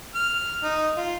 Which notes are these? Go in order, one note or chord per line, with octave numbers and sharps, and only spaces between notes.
F6
D#4
F4